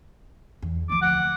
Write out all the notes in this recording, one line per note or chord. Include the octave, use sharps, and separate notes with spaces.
E2
D2 F3 D6
F#5